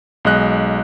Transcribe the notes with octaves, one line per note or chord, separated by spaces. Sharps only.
B1 G#3 D#5 F#6